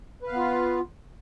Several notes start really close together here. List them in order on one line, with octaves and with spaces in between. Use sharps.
B4 F5 B3 F4